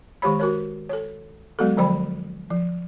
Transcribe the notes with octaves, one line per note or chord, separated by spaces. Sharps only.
D#3 G#3 G4 C#5 B5
F#4 A#4 C#5
A4 C#5
F#3 G#3 B3 F#4 A4
D3 F3 F#3 C5 G5 B5
F3